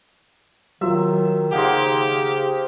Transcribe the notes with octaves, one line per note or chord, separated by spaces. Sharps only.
D#3 F#3 F4 E5
C#3 A#3 D#4 G4 C5 F#5